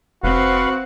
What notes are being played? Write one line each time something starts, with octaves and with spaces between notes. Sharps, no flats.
F1 C4 F#4 B4 F5 F#5